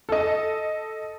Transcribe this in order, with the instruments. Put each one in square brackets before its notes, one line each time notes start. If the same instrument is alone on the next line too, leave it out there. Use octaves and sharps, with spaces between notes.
[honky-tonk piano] A4 D#5